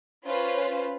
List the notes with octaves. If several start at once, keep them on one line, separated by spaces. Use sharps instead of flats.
C#4 F4 B4 C5